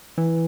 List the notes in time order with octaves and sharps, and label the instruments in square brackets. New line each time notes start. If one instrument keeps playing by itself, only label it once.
[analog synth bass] E3